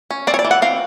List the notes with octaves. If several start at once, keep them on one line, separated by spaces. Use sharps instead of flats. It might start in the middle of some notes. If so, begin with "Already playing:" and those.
C#4
C4 D5
C#5
D5
E3
F#5
C4 F5